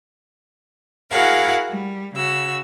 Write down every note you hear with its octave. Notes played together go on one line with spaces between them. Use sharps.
E4 F#4 G#4 A#4 F5 F#5
G3
C#3 F#4 E6